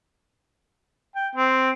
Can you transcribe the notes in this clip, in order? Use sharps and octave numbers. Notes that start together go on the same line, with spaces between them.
G5
C4